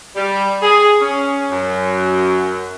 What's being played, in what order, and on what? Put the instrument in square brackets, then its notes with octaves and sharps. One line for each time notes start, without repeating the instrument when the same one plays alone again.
[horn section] G3
G#4
C#4
F#2